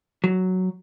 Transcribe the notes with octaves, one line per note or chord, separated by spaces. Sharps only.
F#3